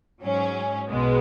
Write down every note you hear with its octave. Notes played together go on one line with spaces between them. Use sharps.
G#2 F#3 C#4
B1 B2 G#3 B3